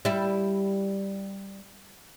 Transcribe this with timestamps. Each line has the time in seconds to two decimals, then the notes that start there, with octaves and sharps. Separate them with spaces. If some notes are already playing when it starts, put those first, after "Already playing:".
0.05 G3 E4